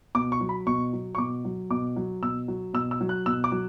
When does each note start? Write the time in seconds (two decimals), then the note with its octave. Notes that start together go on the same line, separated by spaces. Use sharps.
0.15 B2 D6
0.32 C#6
0.41 F#3
0.49 B5
0.67 B2 C#6
0.93 F#3
1.15 C#6
1.18 B2 D6
1.45 F#3
1.70 B2 D6
1.96 F#3
2.22 B2 E6
2.48 F#3
2.74 B2 E6
2.91 E6
3.01 F#3
3.09 F#6
3.26 B2 E6
3.44 D6
3.52 F#3